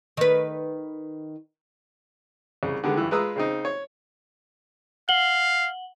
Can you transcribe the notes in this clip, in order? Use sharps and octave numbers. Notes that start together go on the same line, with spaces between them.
D#3 B4
C2 C#3
D3 D#3 G3 G#3 B3
G2 E3
G#3 F4 B4 A#5 D#6 E6
C#3 C4 D#4
C#5
F5 F#5 F#7 G7